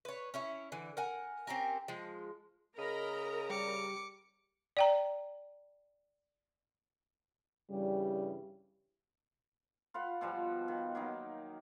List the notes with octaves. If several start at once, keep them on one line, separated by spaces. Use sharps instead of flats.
B4 C#5
C#4 E4 C#5
D3 E3
A#4 F#5 G#5
C4 C#4 G4 A#4
F3 G#3
C#3 A#4 D#5 A#5 B5
G3 D6 C#7
D5 G5 A#5
G2 C#3 E3 G3
F4 B4 F5 F#5
B2 F3 G3 B3
D#3
F#3 A#3 D#4